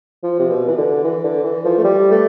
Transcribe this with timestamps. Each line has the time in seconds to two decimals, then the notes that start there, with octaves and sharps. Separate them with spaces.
0.23 F3
0.39 C3
0.49 B2
0.68 E3
0.77 D3
1.04 E3
1.23 D3
1.44 E3
1.65 F3
1.78 A3
1.84 G3
2.11 A3